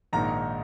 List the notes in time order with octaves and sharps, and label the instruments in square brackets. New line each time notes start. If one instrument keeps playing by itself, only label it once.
[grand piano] A#1 G#2 D#3 A#3 D#4 A#5